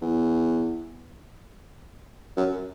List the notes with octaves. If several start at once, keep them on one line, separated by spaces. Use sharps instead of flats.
E2
F#2